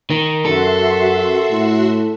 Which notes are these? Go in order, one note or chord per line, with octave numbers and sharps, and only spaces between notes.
D#3 A#4
F#2 F#4 A4 E5 C6
A2